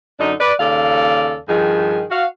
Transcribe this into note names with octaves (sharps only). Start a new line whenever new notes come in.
F#2 D3 D4 D#4
B4 D5
D#2 C#3 A4 D5 F5
G2 D#3 F3 G#4
F#4 F5